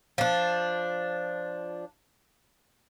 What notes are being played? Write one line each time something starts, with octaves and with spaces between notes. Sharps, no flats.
F3 D4